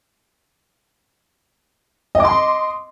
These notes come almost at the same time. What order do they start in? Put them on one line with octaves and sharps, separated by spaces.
D#5 D6 C6